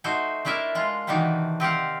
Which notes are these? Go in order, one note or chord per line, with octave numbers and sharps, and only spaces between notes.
A3 D#4 F#4 C5
A3 D4 E4 A#4 E5
G#3 F4
C3 D#3 E3 D4 D#4 F#4
C4 G4 F5 F#5